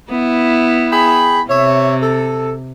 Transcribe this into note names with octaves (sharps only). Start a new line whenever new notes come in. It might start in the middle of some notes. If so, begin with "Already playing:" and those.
B3 E4
G#4 G5 B5
C3 C#5 E5
A4